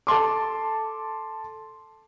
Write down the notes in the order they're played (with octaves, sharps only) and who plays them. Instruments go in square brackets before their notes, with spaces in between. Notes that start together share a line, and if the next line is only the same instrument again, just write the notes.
[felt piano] A4 A5 C6 D6